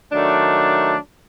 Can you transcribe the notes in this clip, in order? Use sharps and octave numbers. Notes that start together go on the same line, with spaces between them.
D#3 F#3 A3 D4